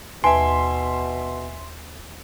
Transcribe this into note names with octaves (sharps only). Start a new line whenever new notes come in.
D#2 B2 B4 E5 G#5 A5 C6